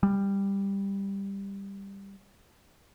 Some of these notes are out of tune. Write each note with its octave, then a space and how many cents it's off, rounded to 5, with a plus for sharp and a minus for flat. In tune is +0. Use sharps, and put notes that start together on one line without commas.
G3 +10